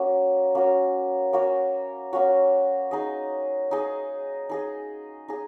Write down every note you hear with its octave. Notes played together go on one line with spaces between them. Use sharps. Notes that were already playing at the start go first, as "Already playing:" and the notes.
Already playing: A#3 C#4 F#4 C#5
A#3 C#4 F#4 C#5
A#3 C#4 F#4 C#5
A#3 C#4 F#4 C#5
D#4 G#4 D#5
D#4 G#4 D#5
D#4 G#4 D#5
D#4 G#4 D#5